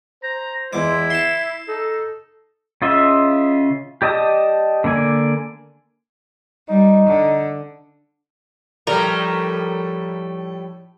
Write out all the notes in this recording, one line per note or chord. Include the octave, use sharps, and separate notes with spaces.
C5 A#5
E2 G#3 E4 D6
E5 A5 C6
D#4 A4
C#3 F4 D#5 E5
G4 D5 D#5 A5 D#6
D3 A#3 D5 G#5
G3 D#4
D3
A2 F3 G3 A3 A#4 B4 D5